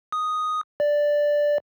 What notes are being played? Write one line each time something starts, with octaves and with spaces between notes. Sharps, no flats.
D#6
D5